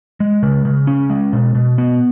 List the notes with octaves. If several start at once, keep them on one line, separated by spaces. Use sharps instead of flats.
G#3
C#3
C#3
C#4
G#3
B2
B2
B3